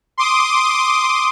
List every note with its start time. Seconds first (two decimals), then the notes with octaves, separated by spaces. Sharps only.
0.18 C6 D6 D#6